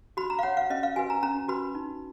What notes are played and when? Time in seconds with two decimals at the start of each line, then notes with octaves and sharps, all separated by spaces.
0.17 F#4 B5
0.30 A#5
0.39 F5
0.43 C#5 F#5
0.57 F5
0.70 C#4 D#5
0.83 F5
0.96 F#4 B4 G#5
1.10 A#5
1.23 C#4 A#5
1.48 F#4 B4 B5
1.75 D#4